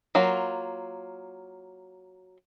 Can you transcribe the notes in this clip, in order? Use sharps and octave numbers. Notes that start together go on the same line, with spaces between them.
F#3 A#3 F4